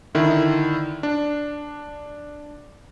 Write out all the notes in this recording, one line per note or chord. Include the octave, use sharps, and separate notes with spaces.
D3 D#3 E4
D4